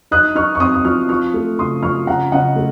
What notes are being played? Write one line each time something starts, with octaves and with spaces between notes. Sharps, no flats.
D#4 D#6 F#6
D#4 C#6 F6
C#6
C4 C6 D#6
D#6
F3 C#6 F6
F3 C#6 F6
A3
C#3 C6 D#6
F3 C#6 F6
C#3 F#5 A#5
C#3 D#5 F#5
A3